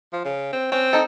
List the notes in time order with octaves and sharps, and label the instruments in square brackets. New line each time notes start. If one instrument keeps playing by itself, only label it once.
[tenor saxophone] F3
C#3
C4
[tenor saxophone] C4 [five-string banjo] C#4
[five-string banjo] D#4 A4